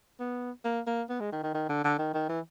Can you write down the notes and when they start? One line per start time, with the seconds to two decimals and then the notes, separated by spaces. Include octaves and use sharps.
0.20 B3
0.64 A#3
0.87 A#3
1.09 B3
1.20 G#3
1.32 D#3
1.43 D#3
1.54 D#3
1.69 D3
1.84 D3
1.98 D#3
2.14 D#3
2.29 E3